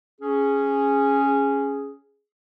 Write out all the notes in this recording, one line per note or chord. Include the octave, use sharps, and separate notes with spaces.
C#4 G#4